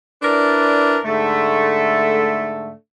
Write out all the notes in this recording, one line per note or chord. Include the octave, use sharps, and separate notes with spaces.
D4 E4 A#4 B4 D5
G#2 D3 A3